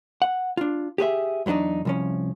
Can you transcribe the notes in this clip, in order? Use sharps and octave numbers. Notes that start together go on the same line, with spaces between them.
F#5
D4 F4
G4 G#4 B4 E5
E2 F#3 B3 D4 D#4
C2 F3 C#4